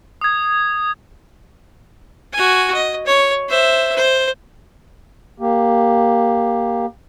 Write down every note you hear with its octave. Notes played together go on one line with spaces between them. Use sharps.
D#6 G#6
F#4 G#5
D#5
C#5
C5 E5
C5
A#3 G4